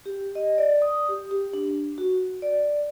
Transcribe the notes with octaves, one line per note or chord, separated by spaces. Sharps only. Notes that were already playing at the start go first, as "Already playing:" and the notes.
G4
D#5
D5
D#6
G4
G4
D4
F#4
D5